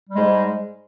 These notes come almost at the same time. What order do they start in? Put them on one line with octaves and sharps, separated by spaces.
G3 G#3 G#2